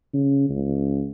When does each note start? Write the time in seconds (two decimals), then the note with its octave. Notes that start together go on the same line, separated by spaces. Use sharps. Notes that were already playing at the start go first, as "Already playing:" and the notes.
0.14 C#3
0.50 C#2